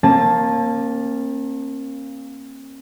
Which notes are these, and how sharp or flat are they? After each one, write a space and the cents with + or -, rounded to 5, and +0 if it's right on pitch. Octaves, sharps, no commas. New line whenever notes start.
A#3 +0 C#4 -45 A5 +0